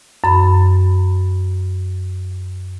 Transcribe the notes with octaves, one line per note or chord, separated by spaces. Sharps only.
F#2 B5